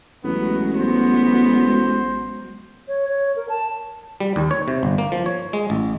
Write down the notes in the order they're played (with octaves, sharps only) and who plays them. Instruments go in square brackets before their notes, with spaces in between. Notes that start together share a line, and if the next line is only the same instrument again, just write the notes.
[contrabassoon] A1 [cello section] F#3 G#3 F#4 [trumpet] B3
[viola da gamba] B3 [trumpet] C5
[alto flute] C#5
C#5
A#4
A5
[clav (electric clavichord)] G3
D#2
C#5
C3
G1
A#3
F3
C#5
G#3
A1